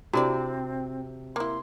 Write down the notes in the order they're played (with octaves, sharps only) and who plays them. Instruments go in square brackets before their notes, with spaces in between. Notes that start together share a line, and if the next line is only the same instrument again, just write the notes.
[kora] C3 [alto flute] C4 [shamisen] D4 E4 D5 [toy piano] F#4 A#5
[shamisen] A#3 E4 [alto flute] C6